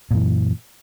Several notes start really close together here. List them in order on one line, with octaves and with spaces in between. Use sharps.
A#2 F#2 E3